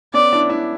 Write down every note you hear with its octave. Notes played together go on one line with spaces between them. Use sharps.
B3 C#4 D5
D4 E4
D4 E4